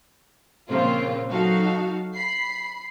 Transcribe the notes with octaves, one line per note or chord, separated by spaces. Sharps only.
A#2 C#3 F3 A#3 C4 F4
F#3 D#4 F#4 A4 F5
B5 C7